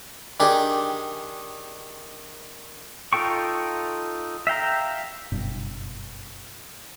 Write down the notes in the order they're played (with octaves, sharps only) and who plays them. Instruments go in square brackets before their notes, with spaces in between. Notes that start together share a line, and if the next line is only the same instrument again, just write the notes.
[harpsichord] D#3 D4 G4 G#4
[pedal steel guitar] D#4 F4 A4 G5 C#6
E5 F5 G5 A#5
[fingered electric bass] F#1 G2 B2